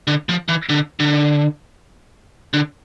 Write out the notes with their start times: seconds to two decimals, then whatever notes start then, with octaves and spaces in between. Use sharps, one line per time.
0.07 D3
0.29 F3
0.49 E3
0.69 D3
1.00 D3
2.54 D3